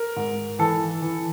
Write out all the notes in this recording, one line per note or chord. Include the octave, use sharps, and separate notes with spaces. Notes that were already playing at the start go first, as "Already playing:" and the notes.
Already playing: A#4
G#2
E3 A4
E3